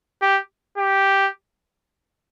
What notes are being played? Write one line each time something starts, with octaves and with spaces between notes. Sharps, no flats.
G4
G4